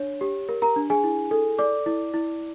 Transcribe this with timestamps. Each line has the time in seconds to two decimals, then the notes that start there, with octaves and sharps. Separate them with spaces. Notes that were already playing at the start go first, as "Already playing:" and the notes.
Already playing: D4 C#5
0.21 G4
0.49 A#4
0.62 A#4 A#5
0.76 D4
0.90 G#4 G#5
1.04 E4
1.31 A4
1.59 D5 D6
1.86 E4
2.14 E4